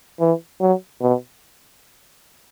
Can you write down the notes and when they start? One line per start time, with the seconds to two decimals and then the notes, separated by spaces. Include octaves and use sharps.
0.20 E3
0.61 F#3
1.01 B2